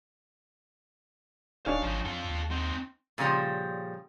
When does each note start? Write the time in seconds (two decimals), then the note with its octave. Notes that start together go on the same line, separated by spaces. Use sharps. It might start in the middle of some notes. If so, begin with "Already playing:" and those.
1.66 D1 D#3 C#4 D4 F5
1.82 G#1 F3 D#4
2.05 F2 F4 A4
2.30 D#2
2.51 C4 D#4
3.18 A#2 C#3 F3 G3